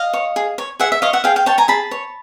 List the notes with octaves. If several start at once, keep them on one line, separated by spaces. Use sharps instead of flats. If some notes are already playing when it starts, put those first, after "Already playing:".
Already playing: D#5 F5
C#5
G#4
C#5
G#4 E5 F#5
E5
C#5 D#5 F5
E5 F#5
G#4 F5 G5
F5 G5
C#5 G5 A5
G#5 A#5
G#4 A5 B5
C#5